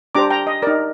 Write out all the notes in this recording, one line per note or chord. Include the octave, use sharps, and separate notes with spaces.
D4 G4 C5 A#5 D6
G5 A#5
D#5
D#4 A#4 D5